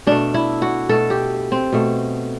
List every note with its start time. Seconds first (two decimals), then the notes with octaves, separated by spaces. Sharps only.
0.07 B2 A3 D4
0.34 E4
0.62 F#4
0.89 B2 A3 A4
1.10 G4
1.52 C4
1.73 B2 A3